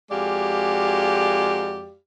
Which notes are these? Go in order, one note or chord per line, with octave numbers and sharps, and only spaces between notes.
F2 G#3 F#4 G4 D5 F5